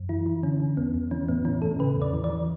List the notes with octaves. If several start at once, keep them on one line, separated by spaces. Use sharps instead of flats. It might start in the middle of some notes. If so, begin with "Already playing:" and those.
Already playing: F#2
E3 E4
E3
D3 C#4
D3
E2 B3
E2
E3 C#4
A2 B3
E3 C#4
A2 A4
C#3 B4
E2
D5
E3
D5
E3